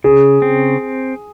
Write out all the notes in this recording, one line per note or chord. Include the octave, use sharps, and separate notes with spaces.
C#3 G#4
C4